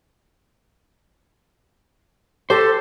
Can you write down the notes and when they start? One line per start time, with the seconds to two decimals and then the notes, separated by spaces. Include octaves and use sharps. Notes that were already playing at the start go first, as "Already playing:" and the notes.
2.50 G4 A4 C5